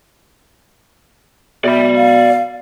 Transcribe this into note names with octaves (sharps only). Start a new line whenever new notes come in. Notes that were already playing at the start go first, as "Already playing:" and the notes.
B2 D5 E5 B5
F5